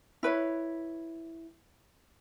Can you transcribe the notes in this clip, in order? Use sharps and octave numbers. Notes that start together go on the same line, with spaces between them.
E4 B4 C#5